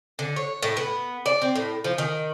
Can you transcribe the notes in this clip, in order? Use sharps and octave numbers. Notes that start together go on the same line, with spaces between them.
D3
C#5
A2
B3
D5
C4
A2
F3
D#3